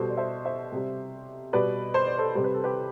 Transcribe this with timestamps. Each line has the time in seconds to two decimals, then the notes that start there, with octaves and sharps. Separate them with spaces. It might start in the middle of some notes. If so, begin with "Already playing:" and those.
Already playing: B2 G3 A4 C5
0.10 D5
0.17 C5 E5
0.45 C5 E5
0.72 C3 G3
1.53 B2 G3 B4 D5
1.94 C5
2.07 D5
2.18 A4 C5
2.35 C3 G3 C5
2.44 B4
2.54 A4
2.64 G4 B4